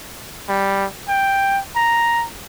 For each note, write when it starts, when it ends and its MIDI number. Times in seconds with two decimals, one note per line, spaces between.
0.48 0.85 55
1.08 1.60 79
1.76 2.24 82